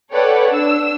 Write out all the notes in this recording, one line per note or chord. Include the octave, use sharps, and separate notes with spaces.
A4 B4 C#5 D5 F#5 G5
D4 E6